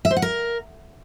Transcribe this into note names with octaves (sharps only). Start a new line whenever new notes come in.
E5
C5
F#5
A#4